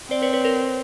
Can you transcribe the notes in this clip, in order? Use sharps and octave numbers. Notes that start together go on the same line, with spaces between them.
C4 C5 D5
B4 C#5
B4 C#5
A#4 C5